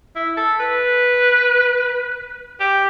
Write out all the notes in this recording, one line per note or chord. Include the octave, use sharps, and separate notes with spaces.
E4
A4
B4
G4